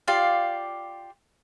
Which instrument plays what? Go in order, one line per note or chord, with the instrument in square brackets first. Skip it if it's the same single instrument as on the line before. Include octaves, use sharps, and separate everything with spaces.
[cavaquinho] F4 G4 D5 F5